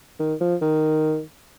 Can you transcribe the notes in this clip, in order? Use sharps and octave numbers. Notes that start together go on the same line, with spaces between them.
D#3
F3
D#3